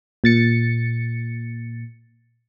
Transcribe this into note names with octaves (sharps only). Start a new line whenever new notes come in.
A#2 A6 C#7